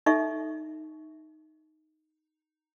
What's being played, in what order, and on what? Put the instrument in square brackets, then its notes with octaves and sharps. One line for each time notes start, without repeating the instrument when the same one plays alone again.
[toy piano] D#4 A4 E5 C#6